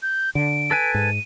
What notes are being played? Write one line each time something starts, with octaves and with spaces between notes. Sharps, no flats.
G6
D3 D7
A4 B4 G#5
G#2 D#7